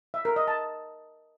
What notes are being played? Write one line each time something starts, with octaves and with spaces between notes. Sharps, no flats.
E5
A#4
D#5
A5